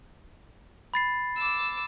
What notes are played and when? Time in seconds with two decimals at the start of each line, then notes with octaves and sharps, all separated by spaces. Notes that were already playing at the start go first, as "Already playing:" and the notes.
0.94 B5 A6 C7
1.36 D6 E6